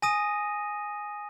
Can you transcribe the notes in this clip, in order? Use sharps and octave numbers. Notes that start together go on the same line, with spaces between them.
G#5 D#6 A#6 D#7